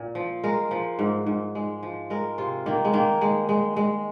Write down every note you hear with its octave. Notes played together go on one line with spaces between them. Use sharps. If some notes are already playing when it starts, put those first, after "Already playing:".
Already playing: A#2
F3
G#3 A#4
F3
G#2
G#2
G#3
F3
G#3 A#4
C3 F4
D#3 A#3
G#3
D#3 A#3
G#3
G#3
G#3